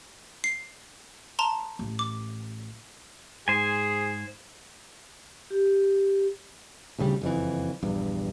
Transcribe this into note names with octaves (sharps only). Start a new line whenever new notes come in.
C7
A5 A#5 C6
A1
D6
G#2 G#4 C5 G#5
G4
D#1 D2 C#3 G3
F#1 F2 E3
A#1 E2 G2